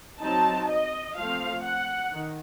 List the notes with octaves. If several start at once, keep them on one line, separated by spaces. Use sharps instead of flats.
F#3 C4 D#4 A5
D#5
F3 A3 C4 F5
F#5
D#3